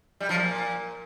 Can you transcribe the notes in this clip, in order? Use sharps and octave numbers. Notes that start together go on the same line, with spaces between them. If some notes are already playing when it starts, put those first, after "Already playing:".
G3
F3
A#2